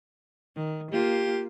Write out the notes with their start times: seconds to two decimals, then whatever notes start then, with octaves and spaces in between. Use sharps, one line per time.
0.56 D#3
0.92 A#3 F4 G4